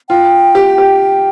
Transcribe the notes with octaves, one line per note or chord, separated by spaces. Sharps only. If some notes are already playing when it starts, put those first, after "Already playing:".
F4 G5
G4
G4